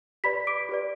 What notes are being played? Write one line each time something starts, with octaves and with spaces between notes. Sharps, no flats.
G4 B4 D5 B5 B6
D6 D7
G4 B4 D5